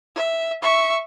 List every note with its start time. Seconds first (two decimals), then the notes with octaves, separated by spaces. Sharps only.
0.16 E5
0.62 E5 C#6